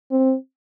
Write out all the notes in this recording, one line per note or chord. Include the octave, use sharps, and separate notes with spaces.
C4